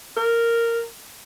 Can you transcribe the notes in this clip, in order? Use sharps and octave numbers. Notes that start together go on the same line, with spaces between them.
A#4